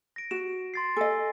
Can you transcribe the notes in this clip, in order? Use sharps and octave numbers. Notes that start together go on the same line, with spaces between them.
A#6 D7
F#4 E7
C6 A6 C7
A4 D#5 G#5